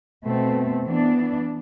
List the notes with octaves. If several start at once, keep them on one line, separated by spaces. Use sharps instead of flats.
B2 A3 C4
E3 B3 D4